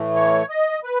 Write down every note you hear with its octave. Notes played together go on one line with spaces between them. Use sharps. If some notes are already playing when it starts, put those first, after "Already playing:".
Already playing: A2 E3 A3
C#5
D#5
B4